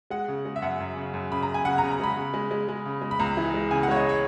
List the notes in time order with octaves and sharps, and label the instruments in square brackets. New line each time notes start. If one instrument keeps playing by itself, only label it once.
[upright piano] G#3 F#5
C#3
G#3
E5
F#2 F#5
F#2
C#3
F#2
C#3 B5
A#5
F#2
G#5
C#3 F#5
A#5
C#3
A#5
G#3 B5
C#3
G#3
G#3
G#3
C#3
G#3
B5
C#2 A#5
E3
G#3
C#3 G#5
F#5
G#3 C#5
D#5
C#5